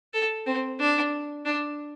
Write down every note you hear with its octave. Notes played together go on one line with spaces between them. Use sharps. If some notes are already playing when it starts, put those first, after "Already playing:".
A4
C4
D4
D4